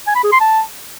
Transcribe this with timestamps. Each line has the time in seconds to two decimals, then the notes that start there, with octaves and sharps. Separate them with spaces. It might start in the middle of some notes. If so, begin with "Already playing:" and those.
0.07 G#5
0.16 B5
0.24 G#4
0.32 C6
0.41 A5